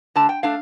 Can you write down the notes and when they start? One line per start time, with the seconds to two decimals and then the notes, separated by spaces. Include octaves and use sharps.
0.16 D3 A3 D4 A5
0.29 G5
0.43 A3 D4 F5